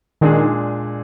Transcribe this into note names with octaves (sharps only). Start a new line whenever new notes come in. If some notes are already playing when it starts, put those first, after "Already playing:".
A#2 D#3 G#3 D4 G#4